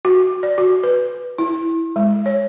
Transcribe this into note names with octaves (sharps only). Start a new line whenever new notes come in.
F#4
D5
F#4
B4
E4
G#3
C#5